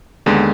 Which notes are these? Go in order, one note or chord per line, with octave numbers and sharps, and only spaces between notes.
D#2 D3 G#3 B3